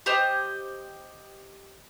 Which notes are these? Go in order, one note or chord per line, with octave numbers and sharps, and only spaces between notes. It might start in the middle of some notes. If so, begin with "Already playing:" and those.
G4 C5 D#5